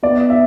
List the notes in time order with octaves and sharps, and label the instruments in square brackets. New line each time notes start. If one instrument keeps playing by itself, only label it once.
[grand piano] B3 [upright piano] D5
[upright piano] E5